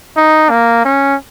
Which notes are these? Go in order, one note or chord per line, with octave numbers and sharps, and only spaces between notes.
D#4
A#3
C#4